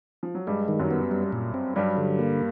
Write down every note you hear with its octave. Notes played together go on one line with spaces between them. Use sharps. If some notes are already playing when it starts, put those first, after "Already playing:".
F3
F#3
G2 G3 G#3
D#3
F#2 F#3
B3
G3
A#2
C4
G2 F#3 G3
D3
A#3